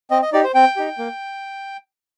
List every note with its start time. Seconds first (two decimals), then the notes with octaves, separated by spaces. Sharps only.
0.11 C4 D#5
0.22 D#5
0.33 D#4 G4 D5
0.44 C5
0.55 C4 G5
0.76 D#4 G4
0.98 A#3